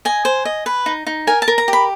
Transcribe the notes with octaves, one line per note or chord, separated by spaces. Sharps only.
D#5 G#5
C5
D#5
B4
D#4
D#4
A#4 G#5
A5
A#4
A#5
G4
B5